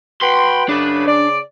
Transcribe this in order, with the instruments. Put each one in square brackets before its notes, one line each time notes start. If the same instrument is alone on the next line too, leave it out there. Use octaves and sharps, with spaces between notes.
[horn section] F#4 B4 G5 [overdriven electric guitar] B5 C6
[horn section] F#2 C#3 B4 [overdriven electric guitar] D4
[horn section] C#3 D5